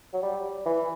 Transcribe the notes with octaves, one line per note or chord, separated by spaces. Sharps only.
F#3
G3
E3